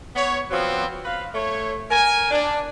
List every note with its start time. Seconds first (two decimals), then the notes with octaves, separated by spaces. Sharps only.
0.14 B3 C#5
0.50 F3 F#3 B3 C4
1.04 B4 F5
1.34 A3 C#5
1.90 A#4 G#5
2.31 D4